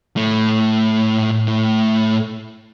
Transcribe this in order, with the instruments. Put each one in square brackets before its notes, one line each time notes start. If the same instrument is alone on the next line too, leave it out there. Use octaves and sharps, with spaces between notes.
[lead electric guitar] A2 A3